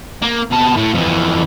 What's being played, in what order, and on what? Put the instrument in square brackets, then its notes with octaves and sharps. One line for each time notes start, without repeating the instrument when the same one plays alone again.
[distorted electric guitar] A#3
B2 A5
A2
F2 E3